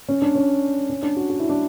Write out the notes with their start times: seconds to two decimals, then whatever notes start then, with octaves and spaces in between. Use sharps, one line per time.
0.09 C#4
0.22 D4
0.35 C#4
0.90 C#4
1.03 D4
1.16 F#4
1.30 F#4
1.40 E4
1.49 D4